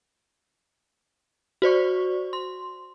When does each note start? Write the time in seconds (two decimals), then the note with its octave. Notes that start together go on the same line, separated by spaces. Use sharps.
1.62 F#4 C5 D5 C#6
2.33 C6